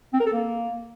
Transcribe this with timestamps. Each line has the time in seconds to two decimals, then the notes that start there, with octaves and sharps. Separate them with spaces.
0.13 C4
0.20 A#4
0.26 A4
0.33 A#3